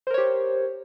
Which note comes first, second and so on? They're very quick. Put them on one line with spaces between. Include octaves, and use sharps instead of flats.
C5 A#4 C#5 G4